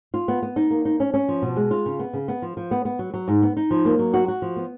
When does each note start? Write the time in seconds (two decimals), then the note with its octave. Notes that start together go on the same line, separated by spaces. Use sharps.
0.14 F4
0.28 B3
0.42 B3
0.56 D#4
0.70 A#3
0.85 D#4
1.00 C#4
1.14 C#4
1.29 F3
1.42 B2
1.56 G#3
1.71 F4
1.86 C#3
1.99 B3
2.13 C#3
2.28 B3
2.42 F3
2.57 F3
2.71 B3
2.85 B3
2.99 F#3
3.14 F#3
3.28 G#2
3.42 B3
3.57 D#4
3.71 F3
3.85 A#3
3.99 F#3
4.14 F#4
4.28 F#4
4.42 F3
4.56 B3